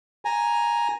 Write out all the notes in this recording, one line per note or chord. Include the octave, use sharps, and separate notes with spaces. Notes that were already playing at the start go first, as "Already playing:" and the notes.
G#5 A#5